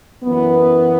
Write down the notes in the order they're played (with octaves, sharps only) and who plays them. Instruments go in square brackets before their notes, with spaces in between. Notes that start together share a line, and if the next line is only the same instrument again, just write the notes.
[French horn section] F#2 E3 B3